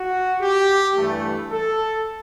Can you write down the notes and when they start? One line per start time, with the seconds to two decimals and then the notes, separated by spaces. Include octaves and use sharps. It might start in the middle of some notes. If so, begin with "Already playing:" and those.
Already playing: F#4
0.40 G4
0.95 G2 E3 A3
1.51 A4